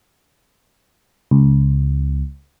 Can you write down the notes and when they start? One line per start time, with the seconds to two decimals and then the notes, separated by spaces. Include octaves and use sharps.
1.31 C#2